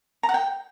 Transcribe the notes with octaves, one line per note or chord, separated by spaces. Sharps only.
A#5
F#5
G5